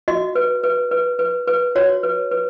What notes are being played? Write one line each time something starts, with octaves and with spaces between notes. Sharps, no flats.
F#4 D#5
B4
B4
B4
B4
B4
F#4 C#5
B4
B4